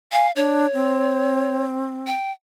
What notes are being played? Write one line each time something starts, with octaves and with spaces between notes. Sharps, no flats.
F5 G#5
D4 C#5
C4
G5